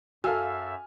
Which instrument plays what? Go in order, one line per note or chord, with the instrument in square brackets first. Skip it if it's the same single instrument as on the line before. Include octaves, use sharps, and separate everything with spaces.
[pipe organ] F#2 E5 [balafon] F#4 [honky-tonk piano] A4 F5 E6 [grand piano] G#5 F6